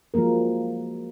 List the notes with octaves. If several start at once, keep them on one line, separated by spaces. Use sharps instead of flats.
F3 F#3 G#3 A#3 A#4